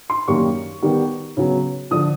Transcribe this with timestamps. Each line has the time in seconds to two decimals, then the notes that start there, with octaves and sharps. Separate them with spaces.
0.10 C6
0.28 F#2 D#3 G3 A#3 C#6
0.82 D#3 G3 B3
1.37 C#3 F#3 B3
1.91 D3 F3 D#6